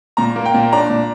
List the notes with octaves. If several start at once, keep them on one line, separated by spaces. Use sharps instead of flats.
A#2 A#5
A#3
G5
A#2
D4 A#5
A#2